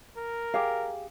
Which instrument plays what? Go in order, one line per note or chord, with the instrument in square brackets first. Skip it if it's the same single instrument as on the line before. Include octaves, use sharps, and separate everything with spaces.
[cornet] A#4
[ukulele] G4 G#4 F5